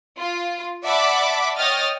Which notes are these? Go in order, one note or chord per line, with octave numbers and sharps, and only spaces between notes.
F4
D5 E5 F#5 A5 B5 D6
C#5 D#5 G5 D#6 F6 A6